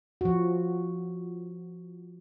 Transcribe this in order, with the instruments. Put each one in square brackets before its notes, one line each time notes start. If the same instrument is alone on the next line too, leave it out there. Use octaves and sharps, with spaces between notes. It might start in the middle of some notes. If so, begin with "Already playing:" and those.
[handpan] F3 F#4